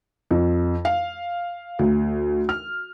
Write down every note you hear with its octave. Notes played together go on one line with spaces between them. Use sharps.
F2
F5
D2
F6